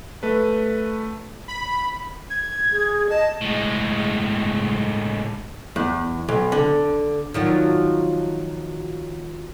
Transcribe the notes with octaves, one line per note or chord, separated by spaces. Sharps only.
A3 B4
B5
G#6
G#4
D#5 A5
A2 G#3
E2
B1
D3
D#3 F3 F#3